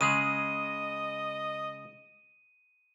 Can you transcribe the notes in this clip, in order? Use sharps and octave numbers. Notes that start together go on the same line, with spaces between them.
C#3 G#3 G#4 D#5 D#7